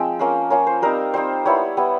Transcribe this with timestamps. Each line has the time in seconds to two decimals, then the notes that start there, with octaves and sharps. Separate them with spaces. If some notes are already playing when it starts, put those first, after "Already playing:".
Already playing: F3 G#3 C4 G5
0.19 A#3 C#4 F4
0.50 A#3 C#4 F4 C#5
0.67 C5
0.82 G3 C4 D#4 A#4
1.14 G3 C4 D#4 C5
1.45 G3 B3 E4 C#5
1.77 G3 B3 E4